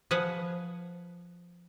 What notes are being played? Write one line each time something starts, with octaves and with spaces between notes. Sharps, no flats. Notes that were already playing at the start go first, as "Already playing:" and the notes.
F3 G#4 B4 F#5